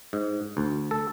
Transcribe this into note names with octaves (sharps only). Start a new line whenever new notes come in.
G#2
D2
A4